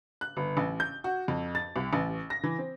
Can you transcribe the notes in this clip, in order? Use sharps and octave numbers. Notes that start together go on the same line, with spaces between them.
F#6
G1
A1
G6
F#4
F2
A6
C2
A1
A#6
E3
C4